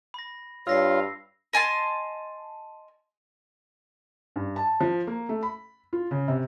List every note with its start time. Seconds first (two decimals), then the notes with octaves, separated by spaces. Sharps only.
0.14 B5 A#6
0.67 G2 F4 C#5 E6 A#6 C7
1.53 D#5 G#5 A5 C6
4.36 G2
4.56 A5
4.80 F3
5.07 A#3
5.29 A3
5.43 B5
5.93 F4
6.11 C#3
6.28 C3